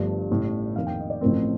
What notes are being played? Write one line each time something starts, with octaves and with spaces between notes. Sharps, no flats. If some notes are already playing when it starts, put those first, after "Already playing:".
Already playing: G1 G2 F3 A3
A1 A2 G3
F2 D#3 A#3 F5
G5
D#5
D5
A1 A2 F3 A3 C4 A#4